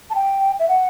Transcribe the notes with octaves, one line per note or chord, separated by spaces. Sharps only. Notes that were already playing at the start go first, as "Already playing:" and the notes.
A5
G5
E5
F#5